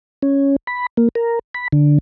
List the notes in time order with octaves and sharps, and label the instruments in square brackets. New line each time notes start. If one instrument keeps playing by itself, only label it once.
[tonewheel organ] C#4
B5
A#3
A#4
B5
D3